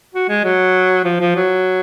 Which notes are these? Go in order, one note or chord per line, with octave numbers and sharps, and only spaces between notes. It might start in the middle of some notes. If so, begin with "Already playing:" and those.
F#4
G#3
F#3
F3
F3
F#3